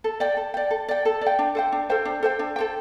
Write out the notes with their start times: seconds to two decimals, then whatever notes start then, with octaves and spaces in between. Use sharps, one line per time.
0.04 A4
0.20 D5 G5
0.37 A4
0.54 D5 G5
0.71 A4
0.89 D5 G5
1.05 A4
1.21 D5
1.26 G5
1.39 D4
1.55 A4 C5 G5
1.72 D4
1.90 A4 C5 G5
2.05 D4
2.23 A4 C5 G5
2.39 D4
2.56 A4 C5 G5